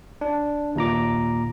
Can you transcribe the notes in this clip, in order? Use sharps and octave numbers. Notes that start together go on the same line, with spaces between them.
D4
D#2 A#2 A#5 D6